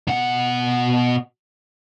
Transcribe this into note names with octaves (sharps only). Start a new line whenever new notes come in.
B2 F#5